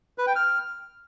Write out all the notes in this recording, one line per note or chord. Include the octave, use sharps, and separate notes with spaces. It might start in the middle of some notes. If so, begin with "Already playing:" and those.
B4
G5
F6